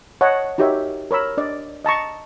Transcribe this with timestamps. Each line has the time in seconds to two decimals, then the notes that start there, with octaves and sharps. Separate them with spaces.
0.21 C#5 D#5 F#5 A5
0.58 D#4 F#4 G4 A#4 C#5 E5
1.11 A#4 C#5 B5 E6
1.37 D4 D5 D#5
1.85 D#5 A5 A#5 C#6